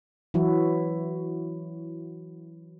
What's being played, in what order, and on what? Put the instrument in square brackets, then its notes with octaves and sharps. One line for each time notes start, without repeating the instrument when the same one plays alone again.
[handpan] E3 F#3 E4 F#4